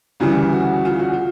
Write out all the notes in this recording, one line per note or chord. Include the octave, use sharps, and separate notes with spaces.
D2 C#3 E3 G3
F#4
F4
F#4
F4